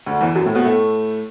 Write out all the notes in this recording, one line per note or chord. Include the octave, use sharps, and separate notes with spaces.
D2 D3
E2 E3
F#2 F#3
A2 A3
B2 B3
A2 A3